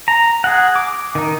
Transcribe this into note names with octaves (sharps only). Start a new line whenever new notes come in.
A#5
G#4 F#5
D6
D#3 D#4